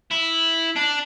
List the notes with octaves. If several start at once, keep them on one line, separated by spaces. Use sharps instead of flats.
E4
D4